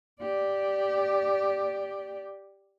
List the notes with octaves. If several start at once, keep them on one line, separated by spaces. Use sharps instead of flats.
G4 D5